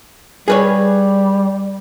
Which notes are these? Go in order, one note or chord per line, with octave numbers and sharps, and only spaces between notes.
G3 G#4 B4 C#5